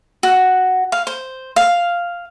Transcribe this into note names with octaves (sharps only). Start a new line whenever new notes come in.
F#4
F5
C5
F5